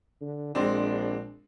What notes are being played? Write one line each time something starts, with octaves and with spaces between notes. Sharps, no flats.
D3
A#1 G#3 C4 D4